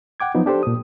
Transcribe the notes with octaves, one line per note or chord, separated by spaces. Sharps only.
F#5 G5 D6 G#6
F3 F#3 B3 D#4
D4 G4 A4 C5
A#2 D#6